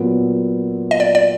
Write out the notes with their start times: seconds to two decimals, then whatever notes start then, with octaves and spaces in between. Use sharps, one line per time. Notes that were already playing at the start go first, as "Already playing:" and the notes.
Already playing: A#2 F#3 B3
0.91 D#5
1.00 D5
1.15 D5